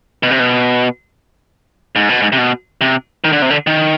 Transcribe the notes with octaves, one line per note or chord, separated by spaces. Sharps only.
B2
C3
B2
G#2
B2
G#2
C3
B2
C3
D#3
D3
C3
D3
D#3